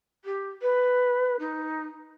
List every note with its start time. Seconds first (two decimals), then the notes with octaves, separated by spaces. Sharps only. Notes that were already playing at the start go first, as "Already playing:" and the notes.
0.25 G4
0.62 B4
1.39 D#4